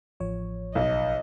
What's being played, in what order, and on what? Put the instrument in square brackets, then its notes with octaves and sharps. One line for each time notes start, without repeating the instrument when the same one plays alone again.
[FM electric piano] A1 F3 C#5
[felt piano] B1 [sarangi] D#5